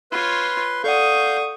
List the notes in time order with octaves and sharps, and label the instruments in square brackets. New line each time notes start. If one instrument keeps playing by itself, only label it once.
[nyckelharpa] F4 C#5 [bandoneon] B4 C6
[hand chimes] A4 D5 F#5 [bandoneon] F5 G6 [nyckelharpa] C#6 D#6